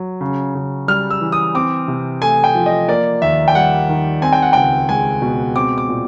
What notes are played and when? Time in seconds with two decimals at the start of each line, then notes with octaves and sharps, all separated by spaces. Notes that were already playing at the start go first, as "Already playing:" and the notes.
Already playing: F#3
0.21 C#3
0.55 C#3
0.88 G3 F6
1.10 E6
1.21 E3
1.32 D#6
1.55 C4 D6
1.88 C3
2.22 A3 G#5
2.44 G5
2.55 F3
2.66 D#5
2.88 A#3 D5
3.22 D#2 E5
3.48 G5
3.55 G3 F#5
3.89 D#3
4.22 C4 G#5
4.33 G5
4.42 F#5
4.53 C#2 G5
4.89 G#3 G#5
5.22 B2
5.56 C4 D6
5.78 D6
5.89 A#2